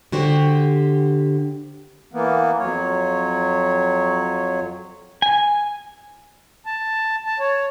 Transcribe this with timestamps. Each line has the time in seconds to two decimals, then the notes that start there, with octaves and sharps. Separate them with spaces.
0.12 D3 F#4 G4 C5
2.13 E3 A#3 B3
2.59 F2 F#3 C#5
5.22 G#5
6.66 A5
7.26 A5
7.40 C#5